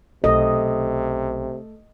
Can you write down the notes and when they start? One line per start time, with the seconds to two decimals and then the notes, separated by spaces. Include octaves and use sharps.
0.24 B1 C3 A3 C#4 D#5